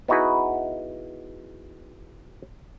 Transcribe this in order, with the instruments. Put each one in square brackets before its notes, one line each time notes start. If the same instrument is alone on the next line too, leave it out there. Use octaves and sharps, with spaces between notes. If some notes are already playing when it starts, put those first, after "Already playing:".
[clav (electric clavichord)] B3 D#4 E4 F#4 G#4 B4